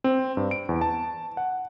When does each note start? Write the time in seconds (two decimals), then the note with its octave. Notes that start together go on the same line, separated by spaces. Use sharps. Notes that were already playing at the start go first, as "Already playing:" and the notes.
0.04 C4
0.37 G2
0.51 D7
0.69 E2
0.81 A5
1.37 F#5